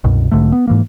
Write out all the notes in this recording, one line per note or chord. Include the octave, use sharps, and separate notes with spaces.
C2 F#2 B2
B1 G#2 D3 A3
B3
G#2 E3 A#3